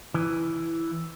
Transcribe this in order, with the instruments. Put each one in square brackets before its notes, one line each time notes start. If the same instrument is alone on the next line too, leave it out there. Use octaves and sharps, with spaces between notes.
[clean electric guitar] E3